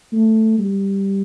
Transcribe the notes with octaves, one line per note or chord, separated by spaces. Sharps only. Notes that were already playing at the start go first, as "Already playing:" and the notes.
A3
G3